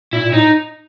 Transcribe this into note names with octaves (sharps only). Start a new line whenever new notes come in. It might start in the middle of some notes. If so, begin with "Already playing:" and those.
A#2 E4
A#2
A2 D#4